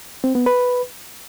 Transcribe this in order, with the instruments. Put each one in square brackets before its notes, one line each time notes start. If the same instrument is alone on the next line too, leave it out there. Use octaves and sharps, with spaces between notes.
[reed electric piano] C4
B3
B4